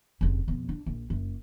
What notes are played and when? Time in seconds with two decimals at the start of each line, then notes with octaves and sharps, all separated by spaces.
0.21 F1 C#3
0.48 F2 B2
0.69 D4
0.86 A#1
1.10 F#1